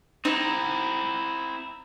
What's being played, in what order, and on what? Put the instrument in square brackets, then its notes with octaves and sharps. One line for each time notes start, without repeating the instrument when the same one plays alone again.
[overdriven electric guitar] C4 E4 [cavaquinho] D#4